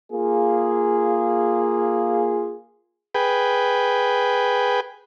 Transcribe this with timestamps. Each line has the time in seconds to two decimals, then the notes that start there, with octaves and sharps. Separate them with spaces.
0.12 A#3 F4 G#4
3.15 G#4 B4 G5